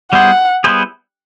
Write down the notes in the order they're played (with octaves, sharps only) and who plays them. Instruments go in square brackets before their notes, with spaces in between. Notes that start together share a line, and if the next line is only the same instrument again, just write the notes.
[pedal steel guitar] G3 B3 E4 G#4 C5 [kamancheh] F#5
[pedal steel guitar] G3 B3 E4 G#4 C5